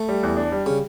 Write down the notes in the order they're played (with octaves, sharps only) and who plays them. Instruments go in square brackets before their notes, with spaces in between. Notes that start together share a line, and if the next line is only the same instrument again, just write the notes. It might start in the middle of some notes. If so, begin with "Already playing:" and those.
Already playing: [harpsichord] A3
[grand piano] G3
E2
D4
G3
[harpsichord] C#3